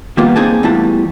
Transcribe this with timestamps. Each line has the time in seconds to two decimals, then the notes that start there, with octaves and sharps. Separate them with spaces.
0.17 D#3 G3 A#3 B3 F4
0.36 A#3 C4 D#4 G#4 G#5 A5
0.63 E2 A2 E3 G3 F4 A5